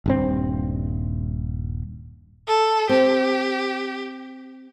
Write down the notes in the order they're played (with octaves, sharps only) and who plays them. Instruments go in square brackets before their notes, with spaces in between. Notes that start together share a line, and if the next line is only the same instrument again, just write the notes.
[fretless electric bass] D#1 G2 C4
[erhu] A4
[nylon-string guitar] C4 [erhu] G4